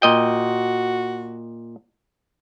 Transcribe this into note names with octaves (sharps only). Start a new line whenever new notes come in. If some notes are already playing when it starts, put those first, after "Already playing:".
A#2 F#4 D#5 G5